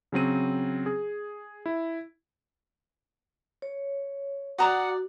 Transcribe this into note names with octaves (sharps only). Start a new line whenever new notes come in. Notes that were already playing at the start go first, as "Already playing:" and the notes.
C#3 F#3 C4 D#7
G#4
E4
C#5
F#4 D5 F#5 A#5 D#6